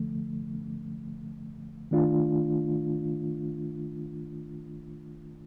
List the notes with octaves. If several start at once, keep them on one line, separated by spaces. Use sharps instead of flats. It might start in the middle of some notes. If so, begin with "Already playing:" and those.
Already playing: D3 F3 A3
D#3 A3 D4 F4